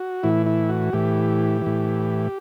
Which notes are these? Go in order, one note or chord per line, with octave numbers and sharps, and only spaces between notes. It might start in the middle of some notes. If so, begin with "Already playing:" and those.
Already playing: F#4
A2 E3 E4
E4
F#4
A2 E3 G4
A2 E3